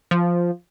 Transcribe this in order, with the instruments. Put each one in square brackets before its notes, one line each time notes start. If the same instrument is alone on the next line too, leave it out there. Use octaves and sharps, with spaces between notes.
[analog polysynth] F3